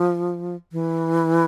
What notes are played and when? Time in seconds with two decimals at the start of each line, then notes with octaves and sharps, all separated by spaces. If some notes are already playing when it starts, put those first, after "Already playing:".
Already playing: F3
0.72 E3